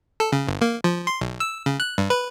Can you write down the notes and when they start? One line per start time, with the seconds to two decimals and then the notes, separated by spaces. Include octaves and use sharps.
0.20 A4
0.32 C#3
0.47 G1
0.61 A#3
0.84 F3
1.07 C6
1.21 B1
1.40 E6
1.66 C#3
1.80 F#6
1.98 G2
2.10 B4